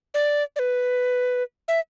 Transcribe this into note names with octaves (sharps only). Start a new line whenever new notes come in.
D5
D5
B4
E5